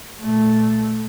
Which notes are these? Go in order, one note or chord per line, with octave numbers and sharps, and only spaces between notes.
A#2 A3